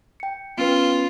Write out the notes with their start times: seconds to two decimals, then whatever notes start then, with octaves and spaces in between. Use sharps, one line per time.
0.20 G5 C#7
0.58 B3 C#4 F4 B4